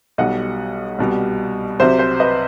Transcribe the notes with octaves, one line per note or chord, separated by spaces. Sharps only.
B1 B2 G3 D#5 F#5
C2 B2 G3
C2 C3 F#3 C5 E5
C5
B4 D#5